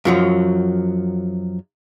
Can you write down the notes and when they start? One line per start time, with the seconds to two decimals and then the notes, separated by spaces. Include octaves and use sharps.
0.05 F#2 F3 F#3